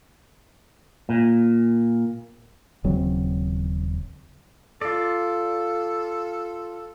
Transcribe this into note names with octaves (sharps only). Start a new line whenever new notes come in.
A#2
D#1 C#3 F#3 C4
F4 A4 D5